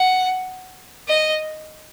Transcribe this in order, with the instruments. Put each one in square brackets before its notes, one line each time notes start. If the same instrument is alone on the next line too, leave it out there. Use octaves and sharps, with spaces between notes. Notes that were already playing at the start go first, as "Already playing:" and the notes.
Already playing: [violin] F#5
D#5